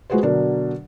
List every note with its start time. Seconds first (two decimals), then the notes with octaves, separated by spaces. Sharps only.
0.10 G#3 F4 F#4 G#4 B4 C5
0.23 B2 D3 F#3 D4 A#4